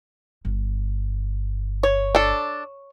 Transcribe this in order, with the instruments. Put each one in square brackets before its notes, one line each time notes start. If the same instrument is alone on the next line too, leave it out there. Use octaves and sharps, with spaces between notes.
[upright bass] G1
[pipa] C#5
[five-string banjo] D4 A4